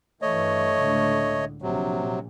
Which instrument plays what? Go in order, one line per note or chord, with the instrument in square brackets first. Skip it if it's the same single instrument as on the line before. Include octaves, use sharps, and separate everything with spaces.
[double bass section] G2 E3 [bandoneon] A3 C#5 D#5
[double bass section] C#2 A2 D3
[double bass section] A#1 [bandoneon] C3 F#3